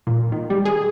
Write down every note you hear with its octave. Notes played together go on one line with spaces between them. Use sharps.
A#2
D#3
G3
G#4